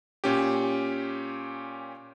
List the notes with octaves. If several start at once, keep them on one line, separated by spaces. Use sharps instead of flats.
A#2 C#4 G4